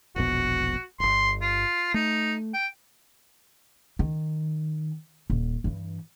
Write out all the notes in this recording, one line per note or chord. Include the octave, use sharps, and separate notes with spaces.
E1 A#1 B2 F#4
D1 G1 C6
F4
A3 D#4
G5
D#3
D#1
G2 E3